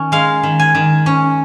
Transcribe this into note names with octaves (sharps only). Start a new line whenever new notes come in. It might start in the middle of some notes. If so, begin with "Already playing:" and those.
Already playing: D#3 C#4
G#3 F5
D#3
G#5
D#3
C#4